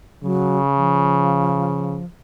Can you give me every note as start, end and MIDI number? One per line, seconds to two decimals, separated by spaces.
0.23 1.99 49
0.23 0.58 54
0.76 2.05 53